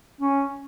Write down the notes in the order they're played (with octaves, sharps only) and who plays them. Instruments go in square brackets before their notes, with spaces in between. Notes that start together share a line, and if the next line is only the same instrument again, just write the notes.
[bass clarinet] C#4